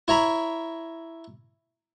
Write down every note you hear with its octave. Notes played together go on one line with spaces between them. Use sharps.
E4 C#5 A#5 B5